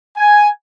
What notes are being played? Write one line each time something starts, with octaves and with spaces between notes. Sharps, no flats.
G#5